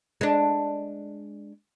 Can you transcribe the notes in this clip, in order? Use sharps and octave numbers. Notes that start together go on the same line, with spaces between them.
G#3 D4